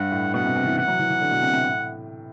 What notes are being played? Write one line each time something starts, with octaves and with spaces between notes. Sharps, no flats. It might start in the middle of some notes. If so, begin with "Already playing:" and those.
Already playing: G2 F#5
A2
B2 F#5
C3
C3
E3
E3 F#5
F#3
E3
E3
D3
B2
C3
C3
A2